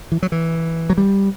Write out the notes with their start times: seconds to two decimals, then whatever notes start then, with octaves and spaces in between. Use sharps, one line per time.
0.12 E3
0.23 F#3
0.32 E3
0.90 F#3
0.98 G3